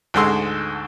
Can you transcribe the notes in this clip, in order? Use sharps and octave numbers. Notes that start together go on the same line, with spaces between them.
D2 G#2 G#3 A4 C6 E6